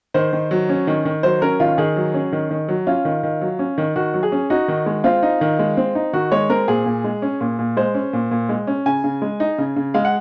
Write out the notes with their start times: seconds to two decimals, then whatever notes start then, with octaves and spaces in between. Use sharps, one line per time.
0.14 D#3 C5
0.33 D#3
0.51 F#3
0.69 C#4
0.87 D#3
1.05 D#3
1.23 F#3 C5
1.42 C#4 A#4
1.60 D#3 F4
1.78 D#3 G#4
1.96 F#3
2.14 C#4
2.32 D#3
2.51 D#3
2.68 F#3
2.87 C#4 F4
3.05 D#3
3.23 D#3
3.41 F#3
3.59 C#4
3.78 D#3
3.96 D#3 F#4
4.14 F#3
4.23 G#4
4.32 C#4
4.50 D#4 F#4
4.68 D#3
4.86 G#3
5.04 C4 F4
5.23 D#4
5.41 D#3
5.59 G#3
5.77 C4
5.95 D#4
6.13 D#3 F#4
6.32 G#3 C#5
6.50 C4 A#4
6.68 A#2 G#4
6.86 A#2
7.04 G#3
7.22 C#4
7.41 A#2
7.59 A#2
7.77 G#3 C5
7.94 C#4
8.13 A#2
8.31 A#2
8.49 G#3
8.67 C#4
8.86 C#3 G#5
9.04 C#3
9.22 G#3
9.40 D#4
9.58 C#3
9.76 C#3
9.94 G#3 F5
10.05 F#5